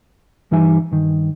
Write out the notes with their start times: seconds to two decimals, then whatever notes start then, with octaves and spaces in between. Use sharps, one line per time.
0.51 G2 E3 G3 D#4 E5 G#5
0.91 G2 D#3